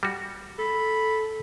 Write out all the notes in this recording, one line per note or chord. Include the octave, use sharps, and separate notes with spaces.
G3 F#4
A4 B5